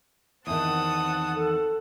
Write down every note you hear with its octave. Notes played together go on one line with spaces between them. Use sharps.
E2 D#3 C4 F#5 A5 D#6
A4